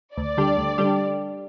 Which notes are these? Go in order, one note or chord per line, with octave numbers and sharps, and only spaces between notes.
D2 D5
D3 G3 D4 G4
D2
D3 G3 D4 G4